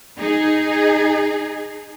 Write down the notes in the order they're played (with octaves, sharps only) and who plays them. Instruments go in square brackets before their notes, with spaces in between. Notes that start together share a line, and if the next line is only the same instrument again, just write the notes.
[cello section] D#4 G#4